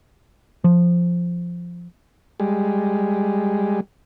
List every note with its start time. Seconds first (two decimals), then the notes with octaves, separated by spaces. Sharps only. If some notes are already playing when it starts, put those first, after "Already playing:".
0.64 F3
2.40 G3 G#3